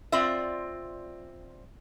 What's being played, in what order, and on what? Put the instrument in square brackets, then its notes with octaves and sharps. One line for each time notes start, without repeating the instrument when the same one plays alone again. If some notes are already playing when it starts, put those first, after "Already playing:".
[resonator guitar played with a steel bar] C4 F4 D5 E5